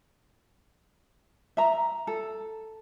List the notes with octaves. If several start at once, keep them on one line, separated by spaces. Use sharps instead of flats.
E5 A#5
A4